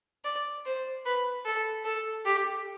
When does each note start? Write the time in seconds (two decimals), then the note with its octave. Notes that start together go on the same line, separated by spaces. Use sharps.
0.24 D5
0.65 C5
1.06 B4
1.45 A4
1.85 A4
2.25 G4